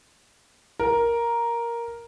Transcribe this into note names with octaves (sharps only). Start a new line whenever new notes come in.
A#4